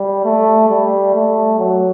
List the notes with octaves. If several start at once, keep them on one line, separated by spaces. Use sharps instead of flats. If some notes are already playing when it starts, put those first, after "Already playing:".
Already playing: G3
A3
G3
A3
F#3